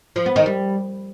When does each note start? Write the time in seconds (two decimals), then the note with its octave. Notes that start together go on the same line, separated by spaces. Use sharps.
0.16 F3
0.26 B3
0.36 D#3
0.46 G3